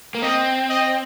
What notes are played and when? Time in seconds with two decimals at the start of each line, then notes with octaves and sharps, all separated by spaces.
0.15 A#3
0.22 C4 D#5
0.69 D#5